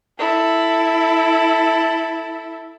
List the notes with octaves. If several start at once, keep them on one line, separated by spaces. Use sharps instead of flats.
E4 A4